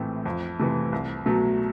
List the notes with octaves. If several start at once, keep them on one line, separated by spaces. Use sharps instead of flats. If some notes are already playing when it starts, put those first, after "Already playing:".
Already playing: A#1 A2 E3 A3 C4
F2
C3 E3 A3
C2
B2 F#3 A3